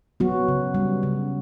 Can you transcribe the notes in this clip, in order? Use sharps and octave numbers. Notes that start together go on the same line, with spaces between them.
F#3 B3 F#4
C#3
G3
C#3